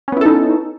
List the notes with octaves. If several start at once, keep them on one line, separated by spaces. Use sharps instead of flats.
B3 C#4 D#4 E4 A4